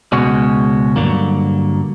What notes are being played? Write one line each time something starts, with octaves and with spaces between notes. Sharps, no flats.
C#2 B2 G#3 C#4 F#4
G2 D3 F#3 A#3